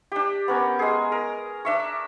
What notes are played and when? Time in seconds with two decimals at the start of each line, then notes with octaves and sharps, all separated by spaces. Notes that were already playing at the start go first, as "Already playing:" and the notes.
0.12 D4 G4
0.48 B3 C#4 A#4
0.79 G#3 G#4
1.12 A#4
1.65 D4 E5 C#6